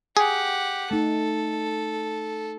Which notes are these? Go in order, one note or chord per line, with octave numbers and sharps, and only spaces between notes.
G4 G#4 F#5
A3 D#4 A4